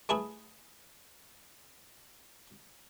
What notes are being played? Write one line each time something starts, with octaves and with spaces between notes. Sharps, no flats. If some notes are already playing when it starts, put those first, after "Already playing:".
A3 E4 G#4 B4